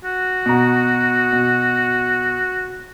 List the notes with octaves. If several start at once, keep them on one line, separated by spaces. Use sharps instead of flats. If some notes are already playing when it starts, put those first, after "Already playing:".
F#4
B2 A#5
B2